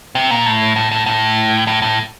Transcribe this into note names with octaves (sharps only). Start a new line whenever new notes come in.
C3
A#2
A2
A2
A2
A2
A2
A2